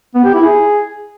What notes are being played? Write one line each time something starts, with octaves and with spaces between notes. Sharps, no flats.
B3
G4
E4
G#4